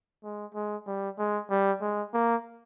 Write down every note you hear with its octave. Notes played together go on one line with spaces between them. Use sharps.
G#3
G#3
G3
G#3
G3
G#3
A#3